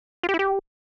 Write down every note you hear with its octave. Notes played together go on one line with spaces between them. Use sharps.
F4
G4
E4
G4